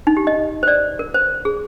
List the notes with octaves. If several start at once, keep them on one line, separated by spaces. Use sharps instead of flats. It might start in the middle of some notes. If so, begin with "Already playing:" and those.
D#4
G4
D#5
C5
D5
A#4
C5
G#4